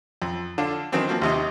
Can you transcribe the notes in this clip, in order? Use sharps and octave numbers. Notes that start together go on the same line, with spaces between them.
F2
D3 D4 F4
D#3 E3 F#3 C4 D4
F3 A#3 C4 F#4
D#2 C3 D#4